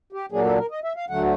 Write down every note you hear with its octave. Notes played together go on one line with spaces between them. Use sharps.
G4
A#2 F#3 A#3 D4 G#4
A4
A#4
D#5
E5
F5
D2 D3 F#3 A3 F#5